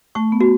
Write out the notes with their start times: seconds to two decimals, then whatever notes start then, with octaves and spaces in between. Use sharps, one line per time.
0.15 A3 C#6
0.32 B3
0.41 F#4